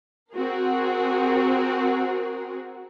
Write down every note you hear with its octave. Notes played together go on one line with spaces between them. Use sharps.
C4 F#4 G#4 A#4